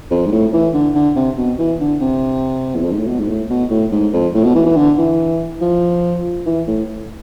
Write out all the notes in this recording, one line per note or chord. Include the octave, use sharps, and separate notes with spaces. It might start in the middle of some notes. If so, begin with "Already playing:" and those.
F2
G#2
A2
E3
D3
D3
C3
B2
E3
D3
C3
E2
F2
G#2
A2
B2
G#2
A2
B2
A2
G#2
F2
A2
B2
E3
E3
D3
E3
F3
E3
A2